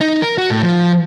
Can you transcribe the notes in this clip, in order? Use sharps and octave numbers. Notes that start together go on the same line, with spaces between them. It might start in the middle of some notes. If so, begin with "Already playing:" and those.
D#4
A#4
F#4
A2
F3